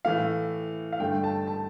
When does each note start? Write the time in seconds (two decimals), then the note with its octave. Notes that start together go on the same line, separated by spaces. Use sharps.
0.05 A2 E3 A3 F5
0.92 F5
1.00 G2 D3 A3 G5
1.24 A5
1.47 A5